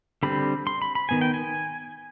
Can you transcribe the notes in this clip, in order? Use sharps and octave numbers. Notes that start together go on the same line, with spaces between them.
D3 G3 C4 B5
C6
B5
B5
D#3 G3 B3 G#5
G5
G#5